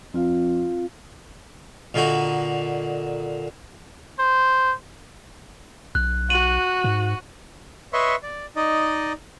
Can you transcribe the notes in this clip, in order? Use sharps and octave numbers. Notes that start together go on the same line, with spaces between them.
F2 C4 F4 F5
A#2 D3 D#4 F#4
C5
B1 F#6
F#4 D#7 F#7
G#2
B4 C#5 D#5 E5 C6 C#6
D5
D#4 D5 D#5